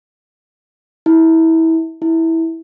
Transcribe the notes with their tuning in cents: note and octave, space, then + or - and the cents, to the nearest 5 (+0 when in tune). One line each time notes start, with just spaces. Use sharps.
E4 -25
E4 -15